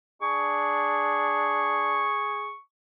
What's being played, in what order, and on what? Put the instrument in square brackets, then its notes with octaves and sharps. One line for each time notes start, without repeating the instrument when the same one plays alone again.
[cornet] D4 [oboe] G#4 [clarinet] C#6